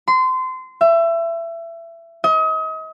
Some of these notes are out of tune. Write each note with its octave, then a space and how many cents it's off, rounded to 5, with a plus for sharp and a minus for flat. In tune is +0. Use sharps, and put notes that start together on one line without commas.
C6 -25
E5 +25
D#5 +35